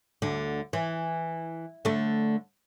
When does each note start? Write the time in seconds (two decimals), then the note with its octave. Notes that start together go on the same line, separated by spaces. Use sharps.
0.22 D2 D3
0.73 E3
1.85 D3 A3